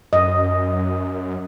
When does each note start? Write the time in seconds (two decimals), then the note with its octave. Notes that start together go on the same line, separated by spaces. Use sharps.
0.13 F#2 D#5